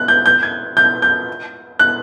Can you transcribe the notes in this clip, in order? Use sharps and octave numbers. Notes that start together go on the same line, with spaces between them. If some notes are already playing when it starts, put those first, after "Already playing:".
Already playing: F#6
G6
G6
G#6
G6
G6
F#6